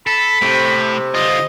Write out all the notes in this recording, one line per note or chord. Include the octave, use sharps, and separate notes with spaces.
A4 B5
A2 C3
D3 F4 D#5